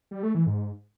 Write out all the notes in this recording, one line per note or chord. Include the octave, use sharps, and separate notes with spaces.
G3
A3
E3
G#2